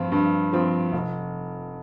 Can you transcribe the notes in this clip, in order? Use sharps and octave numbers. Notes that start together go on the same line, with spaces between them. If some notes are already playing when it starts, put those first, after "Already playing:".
Already playing: G2 F3 C4 F4
G2
F3 C4 F4
F1